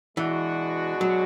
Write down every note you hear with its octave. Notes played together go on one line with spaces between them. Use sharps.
B2 E3 G#3 D4 F#4
F#3